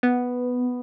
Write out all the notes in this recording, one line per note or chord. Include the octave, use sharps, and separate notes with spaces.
B3